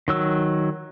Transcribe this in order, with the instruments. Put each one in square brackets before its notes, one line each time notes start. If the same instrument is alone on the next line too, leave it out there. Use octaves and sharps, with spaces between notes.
[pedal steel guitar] D#3 F#3 E6